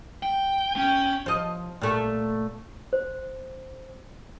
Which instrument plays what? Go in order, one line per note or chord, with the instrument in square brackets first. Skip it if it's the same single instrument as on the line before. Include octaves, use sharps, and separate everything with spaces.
[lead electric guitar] G5
[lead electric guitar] C#4 [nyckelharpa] G5
[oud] F3 D#5
A#2 A3
[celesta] C5